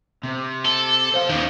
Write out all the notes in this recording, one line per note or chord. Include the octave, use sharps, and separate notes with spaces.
C3
A4
C5 F5
D#2 C#4 D#4